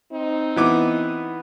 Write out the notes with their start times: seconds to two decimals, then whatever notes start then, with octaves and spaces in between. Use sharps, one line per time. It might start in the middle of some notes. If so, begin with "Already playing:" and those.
0.13 C4 D#4
0.56 E3 B3 D6